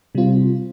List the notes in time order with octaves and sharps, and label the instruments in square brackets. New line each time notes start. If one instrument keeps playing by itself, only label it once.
[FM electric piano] C3 G3 C4 F4